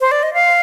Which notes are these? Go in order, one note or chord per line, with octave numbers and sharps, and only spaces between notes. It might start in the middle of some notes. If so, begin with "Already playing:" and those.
C5
D5
D#5
F5